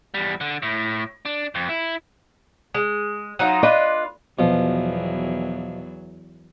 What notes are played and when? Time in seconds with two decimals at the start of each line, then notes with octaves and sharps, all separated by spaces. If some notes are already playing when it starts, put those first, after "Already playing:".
0.14 E2 G3
0.41 D3
0.63 A2
1.25 D4
1.55 F2
1.69 E4
2.74 G#3
3.39 F#3 D#4 F4
3.63 D4 F4 B4 D#5
4.39 E2 B2 F3 F#3